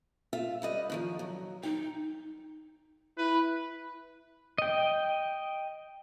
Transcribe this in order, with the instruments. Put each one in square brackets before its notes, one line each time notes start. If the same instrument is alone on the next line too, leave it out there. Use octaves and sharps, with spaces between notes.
[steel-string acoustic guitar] F4 E5
G3 B4 D#5
A2 D#3 F3
F#3
[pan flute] D#4 [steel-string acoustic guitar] G5
[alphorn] E4 [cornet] B4
[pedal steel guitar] D#5 G5